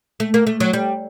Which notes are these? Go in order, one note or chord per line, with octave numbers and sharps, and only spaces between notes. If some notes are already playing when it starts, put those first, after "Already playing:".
A3
A#3
A3
F#3
G3